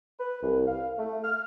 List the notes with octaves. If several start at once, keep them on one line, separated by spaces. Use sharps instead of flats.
B4
C2
F5
A3
F6